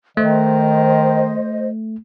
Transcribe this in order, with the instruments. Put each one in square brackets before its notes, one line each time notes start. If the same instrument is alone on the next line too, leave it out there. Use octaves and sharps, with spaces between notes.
[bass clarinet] D#3 [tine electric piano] A3 [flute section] C5 D#5